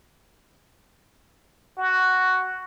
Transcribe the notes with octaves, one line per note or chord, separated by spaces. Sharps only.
F#4